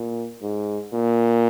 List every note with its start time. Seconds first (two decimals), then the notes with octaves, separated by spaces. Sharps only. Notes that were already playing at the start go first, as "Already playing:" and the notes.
Already playing: A#2
0.42 G#2
0.94 A#2